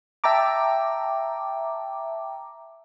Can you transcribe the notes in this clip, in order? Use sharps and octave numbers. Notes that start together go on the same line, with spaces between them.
E5 G5 A5 A#5 D6